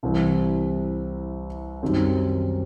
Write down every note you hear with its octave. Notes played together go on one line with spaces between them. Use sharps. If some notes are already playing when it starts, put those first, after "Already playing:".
C2 C3 E3 G3 C4
F#2 D#3 G3 C4